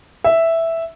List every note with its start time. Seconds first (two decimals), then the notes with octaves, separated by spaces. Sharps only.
0.24 E5